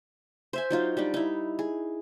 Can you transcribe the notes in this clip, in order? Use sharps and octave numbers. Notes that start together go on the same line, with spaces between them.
C5 E5 G#5
F#3 D#4 F4
G3 D4 D#4
D#4 E4
G#4